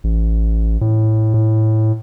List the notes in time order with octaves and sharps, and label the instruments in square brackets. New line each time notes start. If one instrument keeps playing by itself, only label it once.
[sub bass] A1
A2
A2